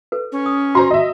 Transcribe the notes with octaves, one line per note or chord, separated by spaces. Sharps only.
A4 B4
C#4
D#6
F#4 C5 A#5 C6
D#5 E5